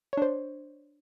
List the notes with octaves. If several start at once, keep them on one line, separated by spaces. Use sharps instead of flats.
D4 C5 C#5